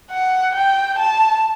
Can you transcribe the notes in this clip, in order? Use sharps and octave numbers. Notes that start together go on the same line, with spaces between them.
F#5
G5
A5